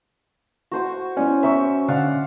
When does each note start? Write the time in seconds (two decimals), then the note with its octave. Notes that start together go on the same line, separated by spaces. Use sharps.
0.71 F#4 C5 C#6
1.17 B3 C#4 E4 D5
1.43 C5 E5 A#5 C#6
1.88 D3 D5 F5 F#5